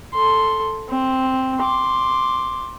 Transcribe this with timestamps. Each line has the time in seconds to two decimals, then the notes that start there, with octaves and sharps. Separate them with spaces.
0.14 A4 C6
0.89 C4
1.59 C6 D6